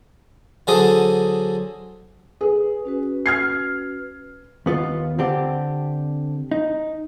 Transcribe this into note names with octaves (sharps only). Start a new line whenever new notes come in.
D3 F#3 G#4 A4 C5 D#6
G#4 B4
C#4 F#4 B4
F6 G#6 C7
D#2 B3 F4
D3 C4 D4 G4
D#4